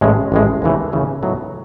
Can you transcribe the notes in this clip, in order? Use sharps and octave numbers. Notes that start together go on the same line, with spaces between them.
A1 A2 G#3
A1 A2 G#3
D#2 C#3 E3 A3
D#2 C#3 E3 A3
A2 F#3 B3 D#4